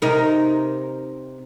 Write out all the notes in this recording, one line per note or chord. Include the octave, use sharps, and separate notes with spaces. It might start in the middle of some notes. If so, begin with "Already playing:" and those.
C3 D#4 A#4